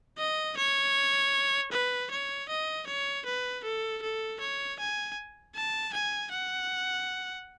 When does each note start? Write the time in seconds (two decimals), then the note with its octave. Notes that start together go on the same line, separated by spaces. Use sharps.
0.18 D#5
0.57 C#5
1.72 B4
2.11 C#5
2.49 D#5
2.87 C#5
3.26 B4
3.64 A4
4.03 A4
4.41 C#5
4.79 G#5
5.55 A5
5.94 G#5
6.31 F#5